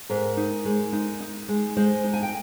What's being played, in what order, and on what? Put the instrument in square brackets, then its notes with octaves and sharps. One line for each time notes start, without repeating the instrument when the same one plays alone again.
[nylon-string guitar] G#2 A#4
D#4
G#3
D#4
D#4
G#3
G#3 C5
D#4
G#5
G5